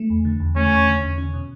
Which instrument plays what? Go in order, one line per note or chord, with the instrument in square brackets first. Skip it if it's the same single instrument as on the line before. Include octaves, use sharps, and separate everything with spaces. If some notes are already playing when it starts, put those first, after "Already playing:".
Already playing: [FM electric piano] A3
E2
D3
E2
[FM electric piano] A3 [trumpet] C#4
[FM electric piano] E2
D3
E2
C#4
B2